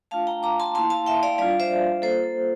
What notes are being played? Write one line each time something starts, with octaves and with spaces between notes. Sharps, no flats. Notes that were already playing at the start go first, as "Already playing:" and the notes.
A3 D4 F4 F5 A5
G5 A#5
A#5 D6
A5 C6
A#3 E4 A5 C6
F5 A5
E5 G5
D5 F5
G3 D4 F4 D5 F5
C5 E5
A#3 F4 A4 C5
A4